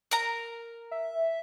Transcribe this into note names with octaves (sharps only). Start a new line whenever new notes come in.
A#4 A#5
E5